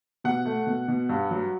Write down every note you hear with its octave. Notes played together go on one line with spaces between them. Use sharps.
B2 F#5
A3
B2
B2
G2
F#3